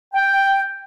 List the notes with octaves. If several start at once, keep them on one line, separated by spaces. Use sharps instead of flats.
G5